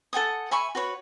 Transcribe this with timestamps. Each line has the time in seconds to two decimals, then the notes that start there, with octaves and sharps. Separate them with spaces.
0.13 A4 F#5 G#5 D#6
0.51 E5 G#5 B5 C#6
0.75 F#4 B4 C#5